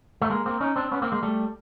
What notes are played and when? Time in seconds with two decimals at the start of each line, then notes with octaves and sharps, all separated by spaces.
0.22 A3
0.30 G#3 A#3
0.46 A#3 C4
0.61 C#4 D#4
0.76 C4 D4
0.92 B3 C#4
1.02 A#3 C4
1.12 G#3 A#3
1.22 G3 A3